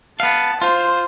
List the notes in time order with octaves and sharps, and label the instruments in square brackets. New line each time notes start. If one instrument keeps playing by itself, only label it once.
[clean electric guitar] B3 F5 [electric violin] A5
[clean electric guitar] F4 [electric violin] C5